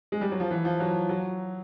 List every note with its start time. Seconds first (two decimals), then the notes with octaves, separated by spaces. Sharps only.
0.12 G#3
0.21 G3
0.32 F#3
0.40 F3
0.51 E3
0.65 F3
0.80 F#3
1.09 F#3